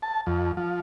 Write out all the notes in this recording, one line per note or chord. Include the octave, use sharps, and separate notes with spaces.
A5
F2
F3